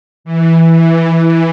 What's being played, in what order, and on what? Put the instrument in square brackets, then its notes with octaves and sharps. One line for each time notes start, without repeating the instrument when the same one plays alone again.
[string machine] E3